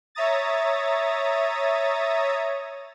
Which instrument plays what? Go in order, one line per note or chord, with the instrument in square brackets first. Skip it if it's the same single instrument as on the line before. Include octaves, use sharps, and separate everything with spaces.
[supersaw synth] C#5 E5 A#5 D#6 A6